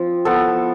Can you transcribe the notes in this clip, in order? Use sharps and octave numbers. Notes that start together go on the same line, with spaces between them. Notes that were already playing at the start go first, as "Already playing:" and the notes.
Already playing: F3 C4 F4
F3 B3 E4 A4